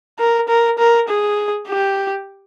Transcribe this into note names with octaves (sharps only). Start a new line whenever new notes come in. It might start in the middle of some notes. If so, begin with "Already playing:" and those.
A#4
A#4
A#4
G#4
G4